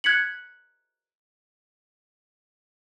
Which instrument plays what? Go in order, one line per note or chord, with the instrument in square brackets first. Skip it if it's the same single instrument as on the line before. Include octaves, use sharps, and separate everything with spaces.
[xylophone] F#6 G#6 B6 C#7 F#7